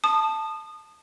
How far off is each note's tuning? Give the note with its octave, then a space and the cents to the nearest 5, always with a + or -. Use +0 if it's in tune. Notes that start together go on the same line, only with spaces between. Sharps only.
A5 +0 D#6 -25